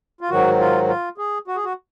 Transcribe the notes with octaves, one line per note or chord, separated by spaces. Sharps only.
F4
G#2 D#3 F#3 F#4
F4
F4
G#4
F#4
G#4
F#4